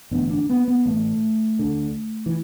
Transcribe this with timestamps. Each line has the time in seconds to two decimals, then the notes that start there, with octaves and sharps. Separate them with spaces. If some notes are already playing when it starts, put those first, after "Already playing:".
0.11 A1 G2 D3 B3
0.30 D4
0.49 B3
0.68 B3
0.85 A1 A2 A3
1.59 D2 D3
2.26 E3